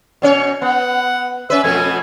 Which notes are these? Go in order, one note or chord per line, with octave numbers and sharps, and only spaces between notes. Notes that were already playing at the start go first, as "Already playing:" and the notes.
B2 C#4 C#5
B3 F#5
C#4 B4 E5
F2 B2 A3 G#5